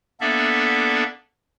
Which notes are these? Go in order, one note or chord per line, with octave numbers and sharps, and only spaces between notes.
A#3 B3 D4 A4 D5 E5